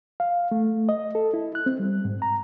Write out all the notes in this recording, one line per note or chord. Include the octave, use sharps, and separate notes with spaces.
F5
A3
D#5
A4
E4
F#6
C4
G3
G#2
A#5